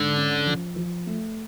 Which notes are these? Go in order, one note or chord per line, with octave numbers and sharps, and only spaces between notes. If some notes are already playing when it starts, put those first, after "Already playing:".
Already playing: G#2 D3
C#4
F3
F3
A3